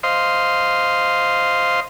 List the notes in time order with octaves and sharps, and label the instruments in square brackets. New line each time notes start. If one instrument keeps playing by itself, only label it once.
[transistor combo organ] C5 D#5 F5 C6